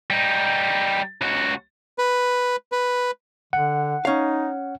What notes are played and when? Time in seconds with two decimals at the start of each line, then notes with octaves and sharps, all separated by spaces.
0.10 G3 D#4
1.22 C#2 F#4
1.98 B4
2.72 B4
3.53 D3 F#5
4.05 C#4 D#4 F5